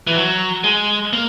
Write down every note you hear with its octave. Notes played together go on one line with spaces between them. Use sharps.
E3
F#3
G#3
A#3